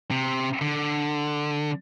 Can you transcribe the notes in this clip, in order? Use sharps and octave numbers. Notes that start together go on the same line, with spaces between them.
C3
D3